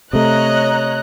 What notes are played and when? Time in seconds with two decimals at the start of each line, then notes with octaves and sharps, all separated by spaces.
0.13 C3 A3 C#5 D#5 A#5 F#6